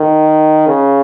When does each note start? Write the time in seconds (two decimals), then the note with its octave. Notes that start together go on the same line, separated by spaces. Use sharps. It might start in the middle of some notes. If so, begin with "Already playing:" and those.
Already playing: D#3
0.68 C#3